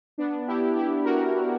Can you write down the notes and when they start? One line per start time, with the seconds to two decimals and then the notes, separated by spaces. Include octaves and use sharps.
0.18 B3 D4
0.47 E4 G4
0.75 E4 G4
1.04 F#4 A#4